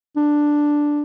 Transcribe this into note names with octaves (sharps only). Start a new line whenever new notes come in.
D4